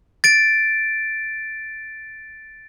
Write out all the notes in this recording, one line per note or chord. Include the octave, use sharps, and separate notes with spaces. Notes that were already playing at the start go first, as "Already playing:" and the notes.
A6 D7